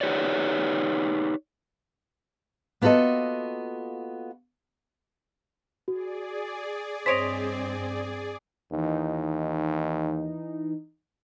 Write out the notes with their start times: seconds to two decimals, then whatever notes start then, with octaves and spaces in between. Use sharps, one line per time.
0.01 D#4 G4 B4 C#5 D5
2.81 A#3 B3 F4 F#4 A4 D#5
5.88 F#4 G#4 D5
7.06 G2 C4 C5 C#5 D#5 B6 D7 F7
8.72 D#2 E3 D#4